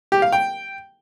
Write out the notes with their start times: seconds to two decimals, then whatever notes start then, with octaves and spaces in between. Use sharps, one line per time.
0.12 G4
0.22 F5
0.33 G5